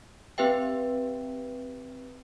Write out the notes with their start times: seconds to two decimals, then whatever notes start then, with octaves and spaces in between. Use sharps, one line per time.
0.38 C4 G4 B4 E5 G5